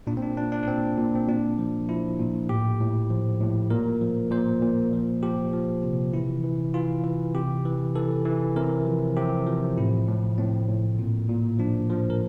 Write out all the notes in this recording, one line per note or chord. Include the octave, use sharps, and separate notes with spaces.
A#2 D4
C4
D4
A#2 D4
D4
D4
A#2 C4
A#2
C4
A#2 D4
F3
F3 E4
A#2
A2 G4
A2
F3
A2
A#2 A#4
F3
A#2 C5
A#2
F3
F3 G4
F3
C3
E3 E4
E3
E3 F4
E3
C3 G4
E3
E3 A4
E3
C3 A#4
F3
C3 G4
F3
A2 E4
A2
A2 C4
A2
A#2
A#2
F3 D4
F3
A#4